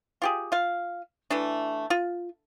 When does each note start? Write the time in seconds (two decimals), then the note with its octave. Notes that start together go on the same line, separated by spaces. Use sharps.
0.22 F4 G4 G#4
0.52 F4 F5
1.30 E3 A3 D4
1.90 F4